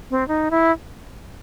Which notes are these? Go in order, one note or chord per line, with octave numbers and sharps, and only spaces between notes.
C4
D#4
E4